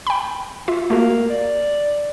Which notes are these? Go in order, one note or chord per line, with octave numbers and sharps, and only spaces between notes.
G5 B5
F4 E5
A3 A#3 F#4
D5